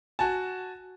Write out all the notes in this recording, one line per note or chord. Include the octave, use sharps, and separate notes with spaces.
F#4 G#5 A5